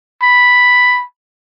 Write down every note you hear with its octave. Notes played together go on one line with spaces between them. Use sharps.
B5